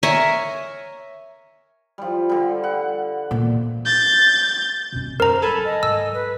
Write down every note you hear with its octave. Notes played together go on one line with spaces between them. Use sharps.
A#4 C#5 E5 G#5
F3 G3
D3 G3
F#5
A#2 E3
G6 A6
B2 C#4
F#2 A#4 C5 A#5
D3 F#3 A4 G#5 A5 B5
D#5
G#2 E6
B4